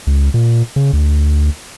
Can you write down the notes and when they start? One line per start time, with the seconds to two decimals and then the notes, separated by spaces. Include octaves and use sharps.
0.07 C#2
0.34 A#2
0.76 C#3
0.93 D2